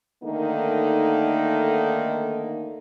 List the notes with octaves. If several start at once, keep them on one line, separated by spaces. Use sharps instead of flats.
D3 D#3 A3 A#3 D#4 A#4